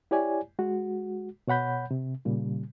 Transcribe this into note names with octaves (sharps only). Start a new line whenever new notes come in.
E4 G4 C#5 D5 G#5
G#3 F#4
B2 C#5 F#5 B5 G6
C3
A#2 C#3 G3